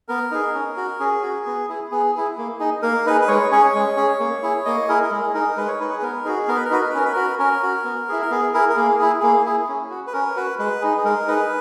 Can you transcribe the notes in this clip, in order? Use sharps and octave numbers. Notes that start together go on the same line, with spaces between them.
B3 A#4
D#4 G#4
C#4
F#4
C#4 G#4
F#4
B3
E4 G#4
B3 G#4
E4 G#4
A#3
D#4 G#4
A#3 A#4
D#4 G#4 B4
B4
G#3 C#5
C#4 G#4 C#5
G#3
C#4 G#4
A#3
E4 G#4
A#3 D#5
E4 G#4 A#4
A#4
G#3 G#4
D#4 G#4 A#4
G#3 B4
C#5
D#4 G#4 B4
G#4
B3 A#4
D#4 F#4 G#4
B3 A#4
B4
A#4
D#4 F#4 B4
A#4
B4
C#4 A#4
B4
F#4 A#4
C#4 A#4
F#4
B3
E4 G#4
A#4
B3 G#4
E4 G#4 A#4
A#4
A#3 G#4
E4 G#4
A#3 G#4
E4 G#4
C#4
F#4
B4
C#4 A#4
F#4 B4
G#3 B4
D#4 G#4
G#4
G#3 A#4
D#4 G#4 B4